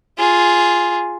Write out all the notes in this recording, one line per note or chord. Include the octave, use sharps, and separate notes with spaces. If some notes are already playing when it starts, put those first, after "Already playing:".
F4 G#4